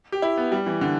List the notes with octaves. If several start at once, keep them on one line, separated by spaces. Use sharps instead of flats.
G4
E4
B3
G3
E3
D3